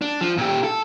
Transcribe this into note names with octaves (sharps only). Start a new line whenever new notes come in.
D4
F3
A#2 G4
A4